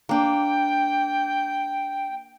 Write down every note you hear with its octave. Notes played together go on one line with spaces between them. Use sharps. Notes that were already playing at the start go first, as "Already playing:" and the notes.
A#3 D4 G5